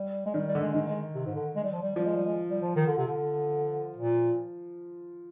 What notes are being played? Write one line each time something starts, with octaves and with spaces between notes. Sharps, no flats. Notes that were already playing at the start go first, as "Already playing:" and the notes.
Already playing: G3
G#3
D#3 G3
G3
D3
G#3
D#3 G#3
G#3
C3
G#2
D3
G#3
G3
F3
G3
F3 G3
G#3
G3
G#3
G3
F3
D#3
D3
C3
D3
A#2